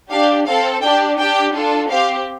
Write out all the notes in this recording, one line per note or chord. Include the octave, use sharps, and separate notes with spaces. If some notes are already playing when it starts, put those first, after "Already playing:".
D4 G4 F5
C4 A4 F5
D4 G4 G5
D4 G4 G5
D4 F4 A4
C4 G4 F5